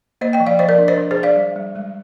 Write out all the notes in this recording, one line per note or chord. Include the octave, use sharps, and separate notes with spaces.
A#3 C5 D#5
D#5 G5
F3
D5 F5
F3 C5 D#5
A#4 D5
D4
C5 D#5
D4
G#4 C5
D4
D5 F5
G3
G3
G#3